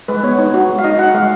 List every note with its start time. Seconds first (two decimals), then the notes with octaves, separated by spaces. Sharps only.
0.08 G#3 B4
0.23 B3 C#5
0.39 D#4
0.54 F#4
0.69 G#3
0.79 F5
0.84 D#4 D#5
0.99 F#4 F#5
1.14 G#3 F5